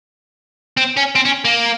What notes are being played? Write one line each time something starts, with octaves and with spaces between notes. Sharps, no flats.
C4
C#4
C4
C#4
A#3